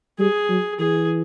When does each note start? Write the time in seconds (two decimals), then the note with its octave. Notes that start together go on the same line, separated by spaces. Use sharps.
0.19 G3 G#4
0.49 F#3
0.80 E3 G#4